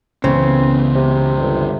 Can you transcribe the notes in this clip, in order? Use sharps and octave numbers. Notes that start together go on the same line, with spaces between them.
C#2 C#3 E3 B3 C4
C3
G1